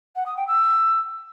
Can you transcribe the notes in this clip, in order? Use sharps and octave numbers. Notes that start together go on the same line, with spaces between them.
F#5
D#6
G5
E6